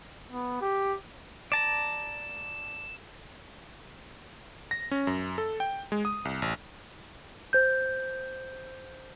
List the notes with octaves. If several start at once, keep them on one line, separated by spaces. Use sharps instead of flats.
B3
G4
D5 A5 A#5 E7
A#6
C#4
F#2
A4
G5
G#3
D#6
C2
A1
C5 G6